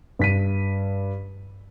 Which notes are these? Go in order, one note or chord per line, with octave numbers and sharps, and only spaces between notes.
G2 B6 D#7